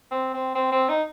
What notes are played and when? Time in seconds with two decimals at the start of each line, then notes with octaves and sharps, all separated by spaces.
0.11 C4
0.34 C4
0.55 C4
0.72 C4
0.89 D#4